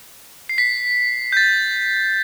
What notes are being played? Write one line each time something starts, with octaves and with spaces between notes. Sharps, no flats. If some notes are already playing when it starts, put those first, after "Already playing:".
C7
B6
G6
A6